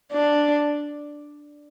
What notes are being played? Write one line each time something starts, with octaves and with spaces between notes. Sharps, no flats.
D4